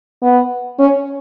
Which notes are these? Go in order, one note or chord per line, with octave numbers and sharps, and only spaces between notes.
B3
C#4